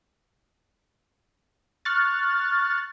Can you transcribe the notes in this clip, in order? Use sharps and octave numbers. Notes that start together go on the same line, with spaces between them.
C#6 F6 F#6 A6